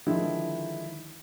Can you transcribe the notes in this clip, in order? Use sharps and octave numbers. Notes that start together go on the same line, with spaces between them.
D3 D#3 F3 G#3 E4